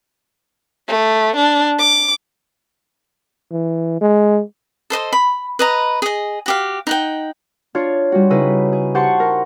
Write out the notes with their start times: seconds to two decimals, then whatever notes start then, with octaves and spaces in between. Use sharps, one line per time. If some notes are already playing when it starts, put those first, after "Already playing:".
0.88 A3
1.37 D4
1.79 D6
3.51 E3
4.01 G#3
4.90 A4 C5 D#5 C6
5.13 B5
5.59 B4 D#5 A#5
6.02 G#4 D#5
6.46 F#4 G4 F5
6.87 D#4 F#5 G5
7.75 D4 F4 C#5
8.12 G3 F#4
8.30 C#3 D#4 E4 B4
8.73 G#4
8.95 G4 C5 F#5 A5 C6 C#6
9.20 A#4